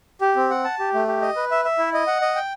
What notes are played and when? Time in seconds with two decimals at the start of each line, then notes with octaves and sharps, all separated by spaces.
0.21 G4
0.36 C4
0.50 F#5
0.64 A5
0.79 G4
0.94 A3
1.07 G4
1.22 D#5
1.36 B4
1.51 E5
1.65 E5
1.78 E4
1.94 D#5
2.07 F#5
2.22 D#5
2.36 G5